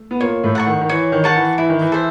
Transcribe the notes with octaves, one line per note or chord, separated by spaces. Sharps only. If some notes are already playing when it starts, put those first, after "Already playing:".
Already playing: A3
B3
A#2 A#3 C#5
A2 A3
F#5 A5 C#6
D#3
D#3
E3 C#5
D#3
F#5 A5 C#6
E3
E3 E4
D#3
E3
A4 C5 E5